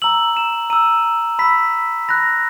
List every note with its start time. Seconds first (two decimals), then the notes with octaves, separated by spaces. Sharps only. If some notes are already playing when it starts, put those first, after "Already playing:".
0.02 A#5 E6 F#7
0.37 E7
0.70 A#5 E6 D#7
1.39 B5 E6 B6
2.09 B5 F#6 A#6